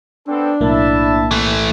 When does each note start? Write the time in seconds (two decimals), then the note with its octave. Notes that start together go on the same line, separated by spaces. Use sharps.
0.28 B3 C4 D4 A4
0.61 B1 A2 A#3 E4 E5 A5
1.31 E3 A3